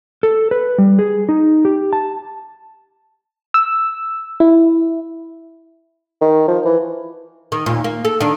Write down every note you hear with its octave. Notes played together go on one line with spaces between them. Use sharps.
A4
B4
G3
G#4
D#4
G4
A5
E6
E4
D#3
F3
E3
D#3
D#2 A#2
A#3
A4
D#3 D4